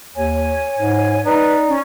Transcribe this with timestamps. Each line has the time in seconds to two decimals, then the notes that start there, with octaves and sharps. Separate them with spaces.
0.16 D#2 C#5 G#5
0.78 G#2
1.25 D#4 B4 D5
1.68 C#4